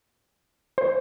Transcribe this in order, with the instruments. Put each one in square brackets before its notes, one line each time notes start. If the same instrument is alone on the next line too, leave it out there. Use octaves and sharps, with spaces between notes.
[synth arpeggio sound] C5